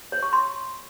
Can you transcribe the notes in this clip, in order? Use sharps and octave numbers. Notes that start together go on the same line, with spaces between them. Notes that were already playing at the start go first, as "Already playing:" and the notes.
C#5
C#6
C6